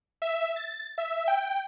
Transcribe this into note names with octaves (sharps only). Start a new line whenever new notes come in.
E5
A6
E5
G5